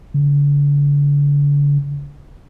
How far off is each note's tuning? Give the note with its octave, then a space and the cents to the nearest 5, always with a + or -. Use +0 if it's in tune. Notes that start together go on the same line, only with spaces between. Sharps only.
D3 -40